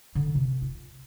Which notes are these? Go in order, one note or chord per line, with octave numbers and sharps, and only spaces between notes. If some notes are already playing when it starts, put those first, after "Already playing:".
D3
C3
F4